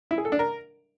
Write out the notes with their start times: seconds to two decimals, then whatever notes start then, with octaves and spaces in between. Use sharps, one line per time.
0.11 E4
0.18 G#4
0.25 A4
0.32 D4
0.39 A#4